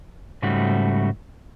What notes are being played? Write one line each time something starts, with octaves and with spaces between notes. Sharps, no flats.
G#2 C#3 G3 A3 F#4